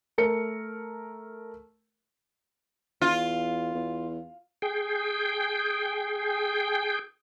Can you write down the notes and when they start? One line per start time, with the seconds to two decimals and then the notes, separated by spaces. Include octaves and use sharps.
0.18 A3 A#4 C#7
3.02 E2 F4
3.75 E2
4.62 G#4 G5